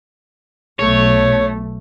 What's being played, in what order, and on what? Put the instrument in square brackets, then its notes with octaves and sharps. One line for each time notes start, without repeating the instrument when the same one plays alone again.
[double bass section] B1 [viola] A3 [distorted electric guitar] C#5